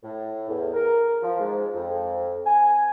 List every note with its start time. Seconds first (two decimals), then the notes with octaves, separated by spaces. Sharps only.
0.03 A2
0.48 E2
0.74 A#4
1.22 F3
1.39 G#2
1.75 F2
2.46 G#5